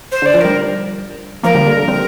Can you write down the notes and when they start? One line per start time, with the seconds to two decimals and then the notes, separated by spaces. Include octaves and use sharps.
0.12 C5
0.22 D3 D5
0.34 F3
0.41 D3 G3 A#4
1.43 F3 A#3 A#4
1.55 D3 G3
1.67 D3
1.77 D3
1.88 G3 C4